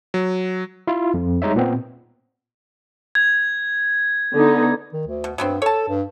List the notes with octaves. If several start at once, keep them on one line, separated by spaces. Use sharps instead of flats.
F#3
E4 F4
F2
G3 G#3 D#4 C#5 E5
A#2 B3 C4
G#6
D3 B3 D#4
D#3
D2
B2
G2 F#3 B3 C4
A4 C#5 A5
G2